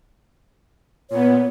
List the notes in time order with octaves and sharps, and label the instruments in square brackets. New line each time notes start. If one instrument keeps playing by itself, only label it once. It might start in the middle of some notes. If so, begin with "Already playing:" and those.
[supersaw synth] A#2 B3 [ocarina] C#5